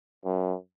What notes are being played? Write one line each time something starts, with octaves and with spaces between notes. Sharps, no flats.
F#2